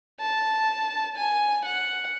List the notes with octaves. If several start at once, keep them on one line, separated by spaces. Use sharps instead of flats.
A5
G#5
F#5